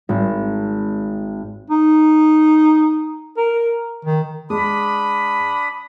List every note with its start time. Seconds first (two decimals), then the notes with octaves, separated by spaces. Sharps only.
0.09 G#1
1.70 D#4
3.37 A#4
4.05 D#3
4.50 G#3 D4 B5 D#6